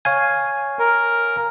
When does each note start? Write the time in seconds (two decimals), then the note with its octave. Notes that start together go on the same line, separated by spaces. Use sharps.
0.05 C#5 F5 G#5
0.79 A#4